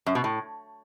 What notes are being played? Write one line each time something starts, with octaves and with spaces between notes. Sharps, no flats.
F#2
B2
A2